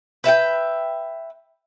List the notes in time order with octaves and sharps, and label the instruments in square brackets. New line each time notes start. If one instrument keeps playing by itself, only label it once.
[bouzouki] B4 E5 F#5 G5